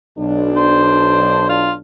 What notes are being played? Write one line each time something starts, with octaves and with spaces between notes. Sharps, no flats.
B1 D4
C5
F4